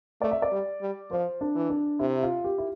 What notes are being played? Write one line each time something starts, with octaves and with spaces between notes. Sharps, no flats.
A3 D5
E5
D5
G3
G3
F3 C5
D4
E3
D4
C3 E4
F4
G4
E4